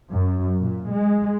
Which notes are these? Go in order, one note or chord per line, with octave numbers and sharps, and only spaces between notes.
F#2
A#2
G#3